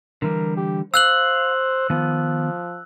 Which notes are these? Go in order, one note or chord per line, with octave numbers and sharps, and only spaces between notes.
D3 E3 G3 A#4
G4
C5 F5 E6 F#6 F#7
D#3 F3 B3